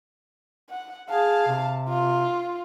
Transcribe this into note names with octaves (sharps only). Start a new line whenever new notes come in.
F#5
G#4 F5 A5
C3
F4